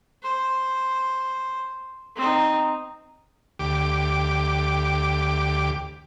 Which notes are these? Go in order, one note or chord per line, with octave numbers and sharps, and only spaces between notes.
C5
C4 D#4
D2 G4 D6